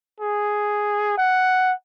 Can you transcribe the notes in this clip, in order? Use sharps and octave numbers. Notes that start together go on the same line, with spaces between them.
G#4
F#5